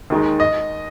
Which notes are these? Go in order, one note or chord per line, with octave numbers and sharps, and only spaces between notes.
D#2 D#3 G#3 D#4
D#5